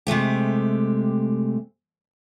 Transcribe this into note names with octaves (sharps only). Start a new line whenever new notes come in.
C3 G#3 A3 G4